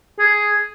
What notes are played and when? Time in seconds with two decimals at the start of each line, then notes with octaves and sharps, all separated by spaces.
0.20 G#4